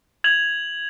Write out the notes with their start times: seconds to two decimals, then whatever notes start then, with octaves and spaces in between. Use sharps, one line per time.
0.24 G#6 F7 F#7